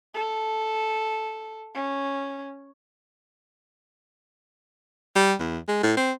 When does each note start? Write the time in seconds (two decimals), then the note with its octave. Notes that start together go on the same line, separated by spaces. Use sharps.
0.14 A4
1.75 C#4
5.16 G3
5.39 E2
5.68 G#3
5.83 A2
5.97 C4